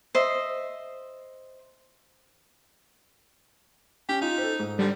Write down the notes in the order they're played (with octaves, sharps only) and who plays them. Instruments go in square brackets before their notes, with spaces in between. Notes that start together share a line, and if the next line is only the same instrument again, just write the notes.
[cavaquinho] C5 D#5 E5
[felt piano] C#4 [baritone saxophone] G4
[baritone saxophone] D#4 [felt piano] F4
[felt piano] A4 C5
G#2
[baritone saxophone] D3 [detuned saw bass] G3